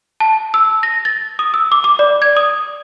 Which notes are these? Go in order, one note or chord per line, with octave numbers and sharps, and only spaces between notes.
A5
E6
A#6
A6
D#6
E6
D6
D6
D5
G#6
D#6